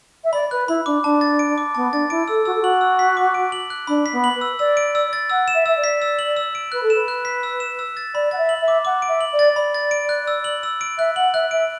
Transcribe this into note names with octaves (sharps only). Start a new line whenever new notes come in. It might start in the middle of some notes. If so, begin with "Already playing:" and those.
E5
D5 B5
B4 F#6
E4 B5
D4 D6
D4 A5
A6
D7
D6
B3 A5
D4 A6
E4 D7
A4 E6
F#4 E6
A4
F#4 F#7
E6
B6
D6
D7
F#7
F#6
D4 B5
B6
B3
F#7
B4
E6
D5 E6
D7
E6
A6
F#5 E6
E7
E5
E5 E6
D5
B6
E6
F#7
E6
D7
B4 F#6
A4
B4 E7
F#6
B6
E6
E7
E6
A6
D5 B5
F#5 A6
E5
F#7
E5
D6
F#5 D6
D7
E5
F#7
D5
A6
D5 B5
A6
D7
F#6
E6
F#7
E6
D7
E5 F#6
F#5 F#7
E5 F#6
E5 D7